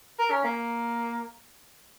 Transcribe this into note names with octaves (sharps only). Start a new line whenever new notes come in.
A#4
C#4
A#3